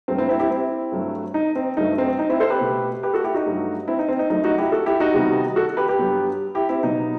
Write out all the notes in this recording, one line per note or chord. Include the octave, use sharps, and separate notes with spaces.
G2 F#3 A3 C4
C4 E4
C4 E4
E4 G4
C4 E4
G2 F#3 A3
D#4
C4
G2 F#3 A3 D#4
C4
D#4
C4 E4
A4 C5
G4 B4
B2 A3
G4 B4
F#4 A4
E4 G4
D#4 F#4
G2 F#3 A3
C4 E4
D#4
C4
D#4
F#2 F#3 A3 D#4
D#4 F#4
E4 G4
F#4 A4
E4 G4
D#4 F#4
C3 D#3 G3 B3
F#4 A4
G4 B4
G4 B4
G2 F#3 B3
E4 G4
C4 E4
B2 F#3 B3 D#4